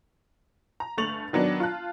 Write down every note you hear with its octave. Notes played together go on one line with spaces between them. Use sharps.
A#5
G1 A3 C#6 A6 F7 F#7
D#3 F#3 B3 D4
F4 A5 F#6